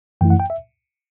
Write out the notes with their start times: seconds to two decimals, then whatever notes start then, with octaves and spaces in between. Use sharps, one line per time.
0.21 F#2 E3 A3 E4 G5
0.30 F#5
0.40 G5
0.50 E5